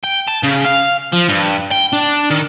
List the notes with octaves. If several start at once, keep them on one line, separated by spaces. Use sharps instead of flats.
G5
A5
C#3
F5
F3
G2
G5
D4
D#3